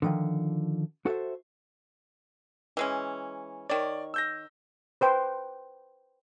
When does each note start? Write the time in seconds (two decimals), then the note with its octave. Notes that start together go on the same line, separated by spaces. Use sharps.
0.02 D3 D#3 F3
1.06 F#4 A4 B4 C5 E5
2.77 E3 G#3 C#4
3.70 D#3 C#5 D5
4.14 E6 G6 A#6
5.01 B4 C5 G5